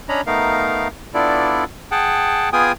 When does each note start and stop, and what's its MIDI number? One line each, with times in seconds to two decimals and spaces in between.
0.09 0.21 61
0.09 0.21 62
0.09 0.21 73
0.09 0.21 75
0.09 0.21 82
0.09 0.21 83
0.27 0.88 57
0.27 0.88 59
0.27 0.88 63
0.27 0.88 70
0.27 0.88 77
1.14 1.64 59
1.14 1.64 62
1.14 1.64 64
1.14 1.64 65
1.14 1.64 69
1.14 1.64 74
1.91 2.49 68
1.91 2.49 78
1.91 2.49 79
1.91 2.49 81
2.53 2.72 59
2.53 2.72 65
2.53 2.72 68
2.53 2.72 79
2.53 2.72 80
2.53 2.72 87